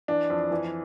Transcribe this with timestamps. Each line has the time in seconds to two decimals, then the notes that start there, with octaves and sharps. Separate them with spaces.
0.08 E3 D4
0.30 F2
0.51 E3